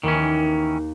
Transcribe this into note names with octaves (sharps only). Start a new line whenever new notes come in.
D#2 D#3 E3 C#4